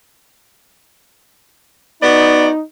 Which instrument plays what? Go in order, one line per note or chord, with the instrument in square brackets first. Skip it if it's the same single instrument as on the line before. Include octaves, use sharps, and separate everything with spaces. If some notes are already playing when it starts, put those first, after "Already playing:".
[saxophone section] B3 F#4 D5 [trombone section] D#4